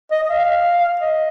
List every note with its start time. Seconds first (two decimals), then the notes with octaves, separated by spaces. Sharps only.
0.11 D#5
0.23 D#5
0.30 F5
1.01 D#5